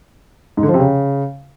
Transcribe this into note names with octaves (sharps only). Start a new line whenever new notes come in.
G#2
D3
F3
C3
C#3